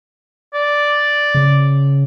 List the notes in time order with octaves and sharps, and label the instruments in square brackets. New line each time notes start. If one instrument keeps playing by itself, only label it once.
[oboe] D5
[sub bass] C#3